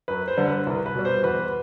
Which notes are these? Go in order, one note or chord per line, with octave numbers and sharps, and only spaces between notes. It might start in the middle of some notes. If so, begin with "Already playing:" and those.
F#2 B4
C5
D3 G3
B4
C2
B4
B2 G3
C5
E2 B4